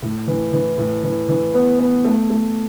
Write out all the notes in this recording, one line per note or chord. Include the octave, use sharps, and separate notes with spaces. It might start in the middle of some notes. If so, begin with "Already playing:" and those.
A2
E3
E3
A2
E3
E3
B3
B3
A3
A3